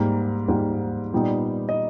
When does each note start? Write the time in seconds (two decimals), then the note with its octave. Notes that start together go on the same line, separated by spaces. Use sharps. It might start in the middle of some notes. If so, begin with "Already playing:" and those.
Already playing: G#2 G3 A#3
0.48 G#2 G3 A#3
1.13 A#2 G3 B3 D#4
1.69 D#5